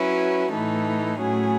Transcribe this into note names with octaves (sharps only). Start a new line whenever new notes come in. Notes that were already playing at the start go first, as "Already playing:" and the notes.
Already playing: F#3 C#4 E4 B4
A2 E3 A3 D#4 A4
A2 F#3 A3 C#4 G#4